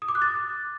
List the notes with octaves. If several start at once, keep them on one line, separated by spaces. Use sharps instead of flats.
D#6
D6
F#6
A6